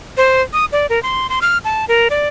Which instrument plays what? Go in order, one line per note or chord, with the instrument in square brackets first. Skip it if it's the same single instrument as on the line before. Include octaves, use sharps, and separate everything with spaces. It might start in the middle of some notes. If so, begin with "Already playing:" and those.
[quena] C5
D#6
D5
A#4
C6
C6
F6
A5
A#4
D5